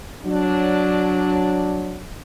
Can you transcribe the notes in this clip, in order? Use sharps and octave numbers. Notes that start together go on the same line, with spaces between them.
F#3 D4